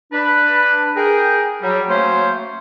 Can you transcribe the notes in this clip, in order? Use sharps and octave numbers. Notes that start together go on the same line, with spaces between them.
D4 B4
G#4 A#4 G5
F#3 G3
F#3 A3 A#3 C#4 C5